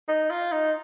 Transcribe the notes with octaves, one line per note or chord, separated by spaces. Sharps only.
D#4
F4
D#4